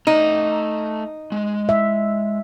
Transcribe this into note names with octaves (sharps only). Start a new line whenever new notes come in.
A3 D#4 A#5
G#3
E5